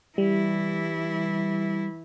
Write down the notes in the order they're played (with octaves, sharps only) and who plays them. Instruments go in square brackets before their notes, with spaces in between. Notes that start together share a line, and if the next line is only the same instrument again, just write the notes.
[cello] E3 E4 [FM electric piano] G3